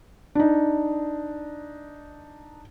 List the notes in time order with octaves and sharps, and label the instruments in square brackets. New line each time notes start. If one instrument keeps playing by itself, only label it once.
[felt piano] D4 D#4